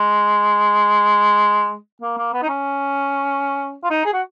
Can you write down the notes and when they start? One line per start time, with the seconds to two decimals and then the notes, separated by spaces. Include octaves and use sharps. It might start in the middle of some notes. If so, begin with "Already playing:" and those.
Already playing: G#3
2.02 A#3
2.17 A#3
2.33 B3
2.42 D#4
2.49 C#4
3.83 F4
3.90 D#4
4.05 G#4
4.13 F#4